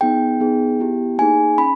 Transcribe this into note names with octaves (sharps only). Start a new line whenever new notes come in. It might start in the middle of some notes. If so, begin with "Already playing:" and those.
B3 D#4 G#4 G5
B3 D#4 G#4
B3 E4 G4
A#3 D#4 G#4 G#5
C#4 B5